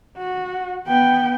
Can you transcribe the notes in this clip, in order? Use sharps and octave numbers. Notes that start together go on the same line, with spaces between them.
F#4
B3 G5